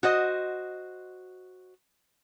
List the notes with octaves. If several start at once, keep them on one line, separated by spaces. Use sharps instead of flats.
F#4 C5 D#5